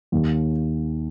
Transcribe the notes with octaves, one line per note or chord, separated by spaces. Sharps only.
D#2